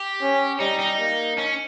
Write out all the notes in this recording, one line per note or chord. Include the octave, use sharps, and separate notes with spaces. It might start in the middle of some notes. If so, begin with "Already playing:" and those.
Already playing: G4
C#4
G3 D#4
D#4
A#3
C#4